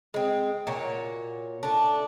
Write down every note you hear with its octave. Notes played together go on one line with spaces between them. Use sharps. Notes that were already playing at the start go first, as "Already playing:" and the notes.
G#3 C4
A#2 F#4 C#5
A3 D4